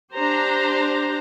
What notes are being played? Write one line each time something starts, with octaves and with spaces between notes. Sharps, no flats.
D4 G4 C5 A#5